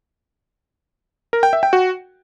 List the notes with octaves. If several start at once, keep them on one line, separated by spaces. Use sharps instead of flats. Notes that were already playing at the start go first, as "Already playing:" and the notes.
A#4
G5
E5
G5
F#4